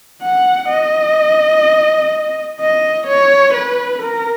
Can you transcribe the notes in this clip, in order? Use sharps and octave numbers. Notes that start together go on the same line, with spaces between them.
F#5
D#5
D#5
C#5
B4
A#4